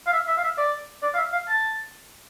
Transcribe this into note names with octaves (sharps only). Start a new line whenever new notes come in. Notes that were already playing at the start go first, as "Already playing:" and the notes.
F5
E5
E5
F5
E5
D5
D5
F5
E5
F5
A5